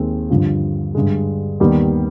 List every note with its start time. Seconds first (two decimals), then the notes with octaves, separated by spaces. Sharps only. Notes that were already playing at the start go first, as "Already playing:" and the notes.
Already playing: D#2 D#3 G#3 C4
0.30 G2 D3 F3
0.95 G2 D3 G#3
1.60 D#2 D#3 G3 B3